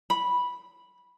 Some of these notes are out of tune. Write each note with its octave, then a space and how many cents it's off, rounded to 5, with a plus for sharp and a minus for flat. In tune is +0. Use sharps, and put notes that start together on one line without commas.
B5 -10